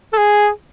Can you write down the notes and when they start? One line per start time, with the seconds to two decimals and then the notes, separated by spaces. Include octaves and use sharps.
0.13 A4
0.17 G#4